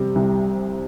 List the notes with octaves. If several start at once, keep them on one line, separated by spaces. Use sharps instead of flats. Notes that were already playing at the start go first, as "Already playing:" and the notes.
Already playing: C3 G3
C2